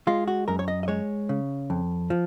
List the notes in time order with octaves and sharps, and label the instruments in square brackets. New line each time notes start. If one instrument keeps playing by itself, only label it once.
[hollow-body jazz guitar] G#3 F4
F#4
F#2 A#4
C#5
D#5
D#5
G#3 C#5
C#3
F2
F3